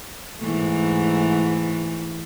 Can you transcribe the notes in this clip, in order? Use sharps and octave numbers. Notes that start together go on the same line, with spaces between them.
G#2 E3 A3